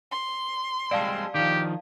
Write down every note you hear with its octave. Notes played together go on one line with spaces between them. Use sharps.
C6
G3 G#3 C4 D5 F5 A5
D#3 F3 G4